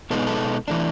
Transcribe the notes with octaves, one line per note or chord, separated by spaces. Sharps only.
B2 G#3 B3 D#4 A4
G#4
A4
E3 A3 D4